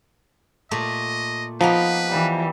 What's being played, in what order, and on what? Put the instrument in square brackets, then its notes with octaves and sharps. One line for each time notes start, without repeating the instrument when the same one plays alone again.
[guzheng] A#2 A3 [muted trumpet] D#5
[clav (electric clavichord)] F3 [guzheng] A#3 B3 D#4 [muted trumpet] B4
[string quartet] E3 G3